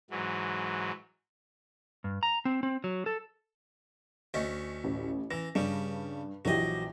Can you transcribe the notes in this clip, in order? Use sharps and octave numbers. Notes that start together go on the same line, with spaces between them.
G#2 E3 F#3
G2
A#5
C4
C4
F#3
A4
D2 A3 C#4 D#5
A1
E3 A#6
G2 C#3 G3
A#1 E3 F#3 G4 D#5